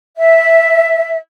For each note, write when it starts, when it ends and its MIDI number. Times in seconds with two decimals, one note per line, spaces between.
0.16 1.17 76